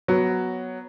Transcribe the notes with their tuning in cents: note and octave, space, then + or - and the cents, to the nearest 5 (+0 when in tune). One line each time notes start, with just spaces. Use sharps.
F#3 +0 B3 +0